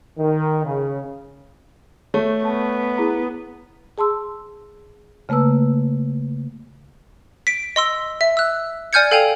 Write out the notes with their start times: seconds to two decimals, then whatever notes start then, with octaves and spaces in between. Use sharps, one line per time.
0.18 D#3
0.65 C#3
2.14 A3 C#5
2.45 B3 A5
2.98 E4 G#4 A#5
3.98 G#4 A5 C6 E6
5.29 C#3 A3 A#3 B4 E6
7.47 B6 D7
7.76 D#5 C6 E6
8.21 E5
8.37 E6 F#6
8.93 D5 G#5 F6 G6 G#6 C#7
9.11 A4 F5 G5 G#5 F7